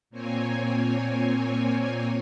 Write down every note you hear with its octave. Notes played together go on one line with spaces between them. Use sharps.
A#2 A#3 C4 C#5 G#5